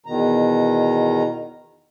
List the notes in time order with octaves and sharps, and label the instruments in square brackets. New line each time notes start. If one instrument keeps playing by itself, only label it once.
[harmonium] E2 B2 D#3 A#5